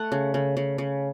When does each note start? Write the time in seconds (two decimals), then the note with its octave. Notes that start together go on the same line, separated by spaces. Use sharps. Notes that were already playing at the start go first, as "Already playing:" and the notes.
Already playing: A3 F#5
0.12 C#3
0.34 C#3
0.57 C#3
0.78 C#3